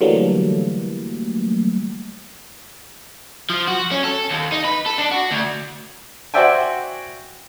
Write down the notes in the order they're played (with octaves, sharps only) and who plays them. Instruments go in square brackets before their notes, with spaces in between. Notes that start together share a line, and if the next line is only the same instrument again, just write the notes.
[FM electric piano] D3 E3 F#3 G3 A3 A#3
[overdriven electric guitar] F3
F#4
C#4
A4
D#2
D#4
B4
A4
D4
F#4
D2
[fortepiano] F#4 C5 D5 E5 G5 G#5